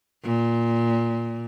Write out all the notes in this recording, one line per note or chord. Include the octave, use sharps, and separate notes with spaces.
A#2